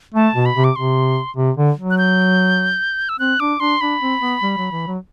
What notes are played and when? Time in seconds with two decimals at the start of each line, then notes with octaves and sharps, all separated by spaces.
0.15 A3 A5
0.35 B2
0.46 B5
0.56 C3
0.64 D6
0.76 C3 C6
1.37 C3
1.57 D3
1.78 F#3
1.90 F#6
1.98 G6
3.09 E6
3.19 C4 F#6
3.40 D4 D6
3.60 D4 C6
3.81 D4 B5
4.01 C4
4.21 B3
4.42 G3
4.58 F#3
4.72 E3
4.87 F#3